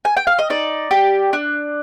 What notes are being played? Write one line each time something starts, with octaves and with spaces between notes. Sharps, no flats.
G#5
G5
F5
D#5
D#4 D5
G4
D4